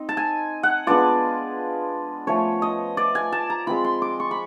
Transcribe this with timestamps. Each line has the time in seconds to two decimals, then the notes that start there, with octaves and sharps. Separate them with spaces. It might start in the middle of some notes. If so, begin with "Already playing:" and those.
Already playing: C4 D#4
0.09 A5
0.17 G#5
0.63 F#5
0.87 G#3 B3 D4 F4 D5
2.27 F3 A3 C#4 C#5
2.62 D#5
2.97 D5
3.15 G#5
3.32 A5
3.50 A#5
3.67 G#3 C4 F4 B5
3.84 C6
4.02 D6
4.20 C#6
4.31 B5